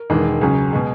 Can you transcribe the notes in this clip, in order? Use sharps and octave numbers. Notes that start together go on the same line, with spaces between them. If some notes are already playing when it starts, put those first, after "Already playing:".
Already playing: A#4
E1 E2 D#3 G#3
C#2 C#3 F#3 G#4
B2 G#3